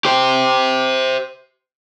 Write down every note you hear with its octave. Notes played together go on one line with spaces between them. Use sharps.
G4 C5